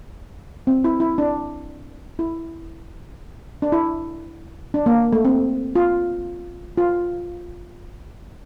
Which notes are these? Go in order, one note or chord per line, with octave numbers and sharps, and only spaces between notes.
C4
E4
E4
D4
E4
D4
E4
D4
A#3
A3
C4
F4
F4